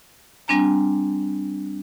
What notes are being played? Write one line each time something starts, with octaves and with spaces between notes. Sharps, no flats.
G3 C4 D4 G#5 A#5